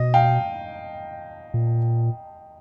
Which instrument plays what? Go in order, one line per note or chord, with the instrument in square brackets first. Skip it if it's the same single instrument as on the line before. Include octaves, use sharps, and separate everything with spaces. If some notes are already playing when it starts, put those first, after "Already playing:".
Already playing: [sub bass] B2 [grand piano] D#5
[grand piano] F5 G5
[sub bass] A#2